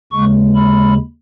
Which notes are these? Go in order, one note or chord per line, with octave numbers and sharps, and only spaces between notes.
D#2 C#3 G#3 C#6
B5